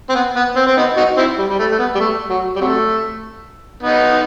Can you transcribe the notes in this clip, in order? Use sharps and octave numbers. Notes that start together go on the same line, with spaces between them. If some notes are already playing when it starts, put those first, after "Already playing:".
C4
B3
B3
C4
C4
B3 D#4
D#4 F#4
C4 E4
G3
G3
A3
A3
B3
G3
A3
F#3
G3
C3 F#3 A3
B3 D#4